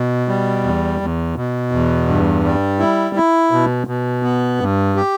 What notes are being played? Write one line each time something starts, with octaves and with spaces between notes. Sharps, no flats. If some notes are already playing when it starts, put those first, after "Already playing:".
Already playing: B2
G3
E2
E2
B2
E2
G2
G3
E4
E4
B2
B2
B3
G2
G4